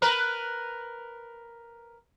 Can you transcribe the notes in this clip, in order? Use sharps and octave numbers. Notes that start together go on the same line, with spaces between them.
A#4 B4